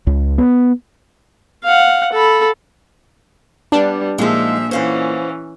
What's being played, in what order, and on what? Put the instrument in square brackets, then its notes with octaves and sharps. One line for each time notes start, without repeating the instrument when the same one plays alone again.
[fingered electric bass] C#2
B3
[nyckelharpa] F5 F#5
A4 B5
[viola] G3 [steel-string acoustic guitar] B3 [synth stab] D4
[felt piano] A#2 [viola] F3 E5 [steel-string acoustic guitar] G#3 D#4
[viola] E3 C#4 [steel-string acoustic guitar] C5 F5 F#5